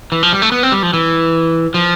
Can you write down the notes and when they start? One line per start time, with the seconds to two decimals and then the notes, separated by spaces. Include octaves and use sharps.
0.12 E3
0.23 F3
0.33 G3
0.42 A3
0.52 B3
0.63 C4
0.72 G3
0.83 F3
0.93 E3
1.74 F3